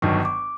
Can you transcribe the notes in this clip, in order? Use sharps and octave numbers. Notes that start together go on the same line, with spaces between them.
G1 G2 D#3 F#3 C#6
D6